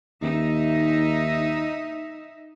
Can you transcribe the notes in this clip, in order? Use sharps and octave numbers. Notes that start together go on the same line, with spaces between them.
D#2 D#4 E5